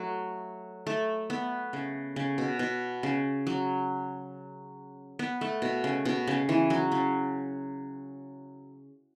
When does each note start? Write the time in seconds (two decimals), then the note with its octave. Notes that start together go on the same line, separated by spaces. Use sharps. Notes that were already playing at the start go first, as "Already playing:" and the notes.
Already playing: F#3 A3
0.87 A3
1.30 B3
1.73 C#3
2.16 C#3
2.38 B2
2.59 B2
3.03 C#3
3.47 F#3
5.19 B3
5.41 A3
5.62 B2
5.84 C#3
6.05 B2
6.27 C#3
6.49 E3
6.70 F#3
6.92 C#3